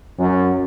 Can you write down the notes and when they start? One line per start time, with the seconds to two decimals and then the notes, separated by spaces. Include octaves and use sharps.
0.18 F#2